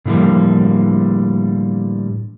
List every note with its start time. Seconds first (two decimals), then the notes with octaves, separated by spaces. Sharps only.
0.05 A2 D3 E3 F3 G3 A#3